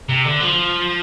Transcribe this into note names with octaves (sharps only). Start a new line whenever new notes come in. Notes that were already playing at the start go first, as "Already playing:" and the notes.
C3
D3
F3